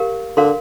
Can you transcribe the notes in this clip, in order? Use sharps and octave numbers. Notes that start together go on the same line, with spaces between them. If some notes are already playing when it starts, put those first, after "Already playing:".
Already playing: G4 A#4 F5
D3 A#4 F5 C6